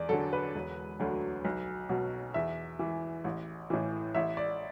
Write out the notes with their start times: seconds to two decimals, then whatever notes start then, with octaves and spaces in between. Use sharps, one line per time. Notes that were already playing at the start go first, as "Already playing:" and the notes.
Already playing: E2 D5
0.09 D3 F#3 A4
0.33 B4
0.55 E1
1.00 D2 D3 F#3
1.45 B1
1.89 B2 F#3
2.34 E2 E5
2.79 E3
3.24 A1
3.70 A2 E3
4.15 A1 E5
4.37 D5